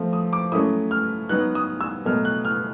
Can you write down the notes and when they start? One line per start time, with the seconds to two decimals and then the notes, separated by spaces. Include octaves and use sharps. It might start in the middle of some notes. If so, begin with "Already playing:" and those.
Already playing: F3 A3 C4
0.13 D#6
0.33 D6
0.52 F#3 A3 C#4 E4 D#6
0.91 F6
1.29 F#3 B3 D#4 F#6
1.55 D#6
1.81 E6
2.06 B2 F#3 A3 F6
2.25 F#6
2.45 F6